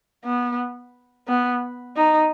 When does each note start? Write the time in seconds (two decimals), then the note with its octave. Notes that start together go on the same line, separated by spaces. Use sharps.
0.25 B3
1.28 B3
1.97 D#4